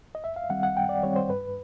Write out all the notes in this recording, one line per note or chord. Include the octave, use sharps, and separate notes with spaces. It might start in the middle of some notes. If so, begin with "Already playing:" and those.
D#5
F#2 E5
F5
D#3 G3 C4 F#5
F#5
F#2 G5
D5
D#3 G3 C4 C#5
C5
G2 B4